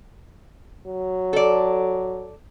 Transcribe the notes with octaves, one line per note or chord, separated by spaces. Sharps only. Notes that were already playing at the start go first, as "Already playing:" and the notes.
F#3
A4 D5